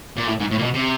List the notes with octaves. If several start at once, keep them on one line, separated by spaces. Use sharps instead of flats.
A#2
A2
G#2
A2
A#2
B2
C3